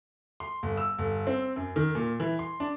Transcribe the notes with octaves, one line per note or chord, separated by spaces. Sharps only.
C6
G1
E6
G1
C4
F#2
D#3
A#2
E3
C6
D4